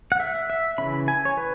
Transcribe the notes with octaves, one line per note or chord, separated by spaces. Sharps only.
F#5
E5
E5
C#3 E3 C#4 B5
G#5
C#5
B4